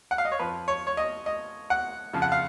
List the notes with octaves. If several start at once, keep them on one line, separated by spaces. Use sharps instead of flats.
F#5
F5
D#5
C#5
F2 F3 B4
C#5
C#5
D#5
D#5
F#5
F2 C#3 F3
F#5
F5